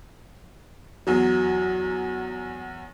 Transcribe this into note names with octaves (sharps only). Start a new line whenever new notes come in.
E2 F#3